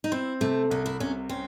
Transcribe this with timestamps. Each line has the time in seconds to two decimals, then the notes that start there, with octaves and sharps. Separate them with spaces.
0.04 D#4
0.12 C4 E4
0.41 C3 A3
0.70 C2 C#4
0.86 E4
1.00 C3 C#4
1.29 C4 C#4